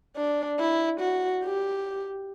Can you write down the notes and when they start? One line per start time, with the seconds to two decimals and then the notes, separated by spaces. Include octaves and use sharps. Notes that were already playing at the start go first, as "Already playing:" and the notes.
0.17 D4
0.59 E4
1.00 F#4
1.43 G4